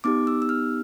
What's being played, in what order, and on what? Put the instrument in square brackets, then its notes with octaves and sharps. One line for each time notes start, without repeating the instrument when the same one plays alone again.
[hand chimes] B3 D#4 G4 D6
E6
E6
F6